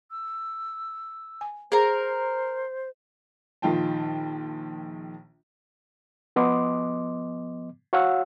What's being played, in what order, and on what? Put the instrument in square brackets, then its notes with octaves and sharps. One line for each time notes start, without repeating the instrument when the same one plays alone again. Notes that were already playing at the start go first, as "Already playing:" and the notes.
[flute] E6
[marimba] G#5
[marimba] G#4 [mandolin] A#4 A#5 [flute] C5
[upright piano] A#1 D#3 F4 G5 A5
[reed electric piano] F3 B3 D#5 C6 D6
F#4 C#5 F5 F#5 E6